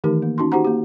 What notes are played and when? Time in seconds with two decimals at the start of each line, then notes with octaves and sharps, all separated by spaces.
0.04 D#3 E3 A3 D#4 G4 A#4
0.22 A#3
0.38 C#4 D#4 F#4 C6
0.52 D#4 F#4 G4 C5 F#5 A#5
0.65 A#3 G4